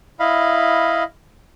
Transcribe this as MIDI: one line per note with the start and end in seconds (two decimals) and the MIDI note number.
0.20 1.03 64
0.20 1.03 75
0.20 1.03 77
0.20 1.03 83